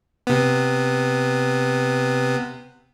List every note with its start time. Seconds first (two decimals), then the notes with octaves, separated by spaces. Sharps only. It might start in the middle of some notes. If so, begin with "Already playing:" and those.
0.27 C3 B3